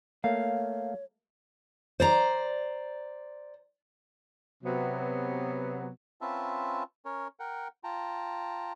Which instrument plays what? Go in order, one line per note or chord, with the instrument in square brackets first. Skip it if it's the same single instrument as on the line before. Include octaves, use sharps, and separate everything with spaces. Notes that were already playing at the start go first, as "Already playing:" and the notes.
[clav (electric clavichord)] A3 A#3 [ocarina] C#5 [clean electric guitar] F5
[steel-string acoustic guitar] C5 D5 A#5
[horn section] C3 F#3 B3
[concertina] C4 C#4 F4 B4 E5 A5
C#4 A#4 C#5
A#4 F#5 G5
F4 G5 A5 A#5